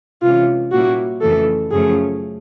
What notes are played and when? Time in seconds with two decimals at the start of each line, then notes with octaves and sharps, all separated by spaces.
0.22 C3 E3 G#3 C#4 F4
0.72 A#2 G3 A#3 C#4 E4 F#4
1.21 F2 C#3 E3 A3 A4
1.71 F#2 C#3 F3 A3 C#4 G#4